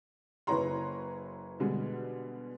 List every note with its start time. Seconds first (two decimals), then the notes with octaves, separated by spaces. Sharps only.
0.47 F#1 E4 B4 C#5 A#5 C6
1.60 B2 D3 G3 G#3 B3